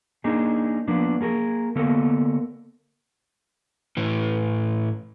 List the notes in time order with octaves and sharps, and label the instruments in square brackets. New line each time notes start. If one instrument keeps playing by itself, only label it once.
[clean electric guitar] A#3 D4 D#4 G#4
F3 A#3 B3 D4
A#3 G#4 A#4
D3 A#3 B3 A4 A#4
[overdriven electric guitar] A2 E3